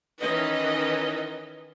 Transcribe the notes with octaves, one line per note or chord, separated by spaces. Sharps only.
D#3 E3 C#4 B4 D#5